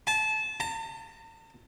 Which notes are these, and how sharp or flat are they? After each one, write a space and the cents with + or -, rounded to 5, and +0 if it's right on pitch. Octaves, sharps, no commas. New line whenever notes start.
A5 -25
A5 +45